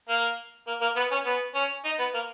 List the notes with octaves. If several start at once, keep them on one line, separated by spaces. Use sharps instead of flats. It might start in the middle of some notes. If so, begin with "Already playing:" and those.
A#3
A#3
A#3
B3
C#4
B3
C#4
D#4
B3
A#3